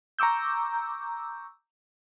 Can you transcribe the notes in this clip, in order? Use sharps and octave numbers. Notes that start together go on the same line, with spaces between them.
A#5 C#6 D6 E6 G6